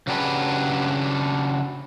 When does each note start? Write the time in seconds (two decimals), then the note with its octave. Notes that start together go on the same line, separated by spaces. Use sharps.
0.07 C#3 F#3 D4 G4 G#4 B4